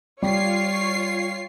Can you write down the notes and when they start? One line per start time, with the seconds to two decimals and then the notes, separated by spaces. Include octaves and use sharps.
0.22 G3 F4 C#5 C7